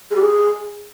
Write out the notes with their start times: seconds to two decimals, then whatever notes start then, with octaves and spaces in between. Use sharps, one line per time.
0.10 G#4
0.15 G4
0.20 G#4